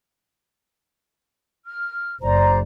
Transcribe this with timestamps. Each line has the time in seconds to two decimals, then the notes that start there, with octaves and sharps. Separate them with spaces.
1.65 F6
2.22 F#1 C5 D5 A#5